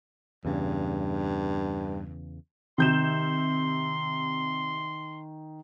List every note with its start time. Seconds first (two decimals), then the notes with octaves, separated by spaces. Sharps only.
0.45 E2 G2 C#3
2.78 C3 D#3 C6 G6 E7